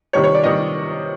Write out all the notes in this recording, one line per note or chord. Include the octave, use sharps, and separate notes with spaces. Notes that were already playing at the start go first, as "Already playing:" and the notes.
C3 D#3 G3 C#5
C#5
D5
C3 D#3 G3 D#5